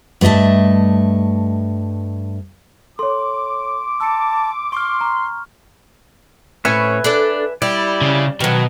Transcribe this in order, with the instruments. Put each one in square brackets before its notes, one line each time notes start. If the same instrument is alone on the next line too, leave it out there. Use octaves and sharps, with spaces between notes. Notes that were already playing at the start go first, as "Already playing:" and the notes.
[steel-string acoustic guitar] G2 A3 D#5 E5 A5
[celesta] A4 C#5 [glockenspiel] C6 [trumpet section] D6
[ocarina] A5 [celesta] E6 C#7
[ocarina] C6 [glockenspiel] C#6 F6
[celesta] A#5
[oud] A2 C#4 C#5 [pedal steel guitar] B4 E5 G#5
[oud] D4 A4 D5
[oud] G3 [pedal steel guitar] E4 D5
[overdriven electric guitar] C#3
[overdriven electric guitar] B2 [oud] D#3 F#3